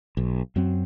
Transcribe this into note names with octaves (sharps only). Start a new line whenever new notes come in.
B1
F#2 F#3 C4